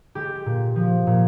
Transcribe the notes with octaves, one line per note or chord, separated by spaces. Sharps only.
G#3 G4
A#2
F3
A#2